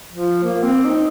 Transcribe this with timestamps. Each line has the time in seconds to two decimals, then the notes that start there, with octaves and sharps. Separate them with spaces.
0.13 F3
0.44 A#3
0.63 C4
0.85 D#4